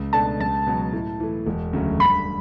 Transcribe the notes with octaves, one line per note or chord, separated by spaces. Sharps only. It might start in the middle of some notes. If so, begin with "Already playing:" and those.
Already playing: C#2
B2 A3 D4 A5
C#2 A5
B2 F#3
A2
E3 A3
E1
D2 C#3 F#3 A3
G2 B5